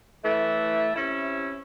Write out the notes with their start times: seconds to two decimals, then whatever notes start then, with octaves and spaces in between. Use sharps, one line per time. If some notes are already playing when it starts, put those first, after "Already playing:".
0.23 A2 E3 A3
0.95 C3 C#4 E4